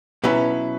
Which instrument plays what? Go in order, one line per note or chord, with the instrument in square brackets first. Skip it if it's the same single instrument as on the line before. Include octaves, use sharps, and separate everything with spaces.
[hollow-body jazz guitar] B2 F#3 C#4 E4 [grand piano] B4